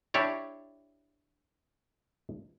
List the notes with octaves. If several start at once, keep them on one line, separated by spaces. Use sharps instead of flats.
D4 E4 G4 C#5 D5